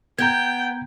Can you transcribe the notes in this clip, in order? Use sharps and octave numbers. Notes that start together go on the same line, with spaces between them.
B3 G5 A#5 G6 G#6